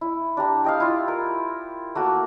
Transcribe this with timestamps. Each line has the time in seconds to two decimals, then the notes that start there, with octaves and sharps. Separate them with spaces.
0.01 E4
0.37 D4 G4 A#5
0.64 G4 D#5 F5
0.80 E4 F4
1.08 A#4
1.95 A3 A#3 F#4